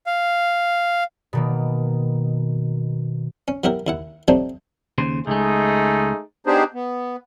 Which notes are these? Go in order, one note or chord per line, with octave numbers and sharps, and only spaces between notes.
F5
B2 D#3 A#3
C#4
F#3 B3 E4 G4 A#4
D#2 E4 F#5
F#3 A3 C4 D4 D#4 G4
D#2 C#3 C5
C#2 G#3 A3 D#4 G#4
B3 D4 D#4 G4 G#4 C5
B3